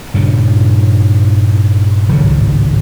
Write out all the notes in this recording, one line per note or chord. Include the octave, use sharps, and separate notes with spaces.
G2 A#2 C#3
G#1 C#2 A2 F#3